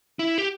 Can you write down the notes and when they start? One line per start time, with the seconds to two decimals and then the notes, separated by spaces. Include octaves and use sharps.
0.19 E4
0.38 G4